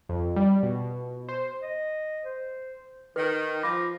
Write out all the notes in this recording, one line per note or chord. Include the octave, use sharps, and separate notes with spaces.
F2
G3
B2
C5
D#5
C5
D#3 B4
F3 B5 D6 A#6